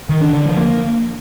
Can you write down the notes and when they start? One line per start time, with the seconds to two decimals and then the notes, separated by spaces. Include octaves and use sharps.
0.09 D#3
0.21 D4
0.33 D3
0.45 F3
0.57 A#3